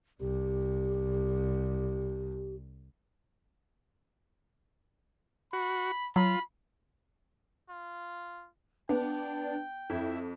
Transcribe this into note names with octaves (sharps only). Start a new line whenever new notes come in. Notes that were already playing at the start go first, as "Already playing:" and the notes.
C2 G4
F#4 B5
F#3 F4 B5
F4
B3 D4 G5
F2 E4